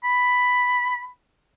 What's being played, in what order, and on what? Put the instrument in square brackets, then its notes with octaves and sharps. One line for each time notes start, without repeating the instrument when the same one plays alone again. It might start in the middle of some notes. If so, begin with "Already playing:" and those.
[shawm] B5